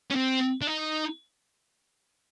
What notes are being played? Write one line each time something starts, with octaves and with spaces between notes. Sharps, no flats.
C#4
C4
D4
D#4